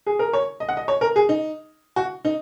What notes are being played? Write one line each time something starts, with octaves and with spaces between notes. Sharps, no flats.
G#4
A#4
C#5
D#5
F#5
D#5
C#5
A#4
G#4
D#4
F#4
D#4